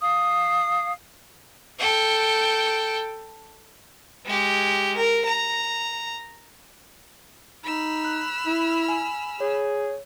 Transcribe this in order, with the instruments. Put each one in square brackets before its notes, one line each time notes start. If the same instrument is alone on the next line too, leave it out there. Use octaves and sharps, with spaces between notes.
[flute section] F5 D#6
[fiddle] A4 G5
[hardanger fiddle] G#3 G4
A#4
A#5
[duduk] D#4 [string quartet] B5 E6 F6
[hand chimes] F#6
[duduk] E4
[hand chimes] G#5
[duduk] G#4 [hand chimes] C#5